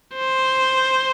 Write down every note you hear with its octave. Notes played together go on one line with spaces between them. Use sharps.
C5